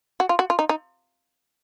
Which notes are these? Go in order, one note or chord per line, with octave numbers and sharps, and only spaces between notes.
F#4
F4
F#4
F4
D#4
D#4